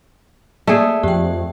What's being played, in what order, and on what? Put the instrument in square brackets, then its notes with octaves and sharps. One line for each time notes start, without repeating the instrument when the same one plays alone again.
[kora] A3 G#4 [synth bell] A#3 D5
[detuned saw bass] F2 [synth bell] G4 G5